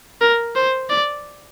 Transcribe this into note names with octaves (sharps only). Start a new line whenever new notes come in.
A#4
C5
D5